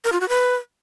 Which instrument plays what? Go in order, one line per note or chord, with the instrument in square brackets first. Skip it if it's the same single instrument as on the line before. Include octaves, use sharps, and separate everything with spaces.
[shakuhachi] A#4
F4
F#4
B4